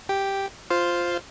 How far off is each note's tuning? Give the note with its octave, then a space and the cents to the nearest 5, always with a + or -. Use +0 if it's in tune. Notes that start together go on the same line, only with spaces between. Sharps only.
G4 +0 G5 +0
F4 +0 C5 +0 F5 +0